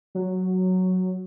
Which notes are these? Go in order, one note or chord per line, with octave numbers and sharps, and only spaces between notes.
F#3